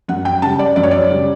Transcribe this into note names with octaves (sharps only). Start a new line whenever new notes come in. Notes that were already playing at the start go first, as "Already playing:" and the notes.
F#2 F#5
G5
C#3 G3 A5
D5
F#2 D5
C#5
D5
C#3 G3